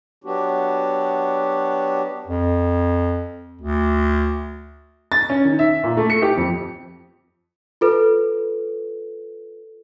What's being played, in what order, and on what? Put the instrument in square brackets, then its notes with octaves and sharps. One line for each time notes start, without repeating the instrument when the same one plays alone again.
[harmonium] F#3 B3 D4 F#4 G4
[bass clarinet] F2
D2
[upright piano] A6
C#4
D#3
E5
A#2
A3
C#7
G4
F2
[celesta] F4 A4 B4